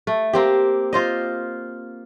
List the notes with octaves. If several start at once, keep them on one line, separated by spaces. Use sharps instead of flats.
A3
A#3 C4 G4
F4 C5 D#5